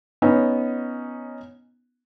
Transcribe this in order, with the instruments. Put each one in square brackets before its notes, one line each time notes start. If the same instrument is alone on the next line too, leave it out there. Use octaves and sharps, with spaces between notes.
[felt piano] B3 C#4 D#4